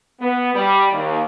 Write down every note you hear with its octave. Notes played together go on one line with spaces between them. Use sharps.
B3
G3
D#2